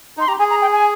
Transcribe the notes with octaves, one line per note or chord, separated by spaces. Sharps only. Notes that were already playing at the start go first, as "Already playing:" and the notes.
D#4 C6
G4 A#5
G#4 G#5
A#5
G5
G#5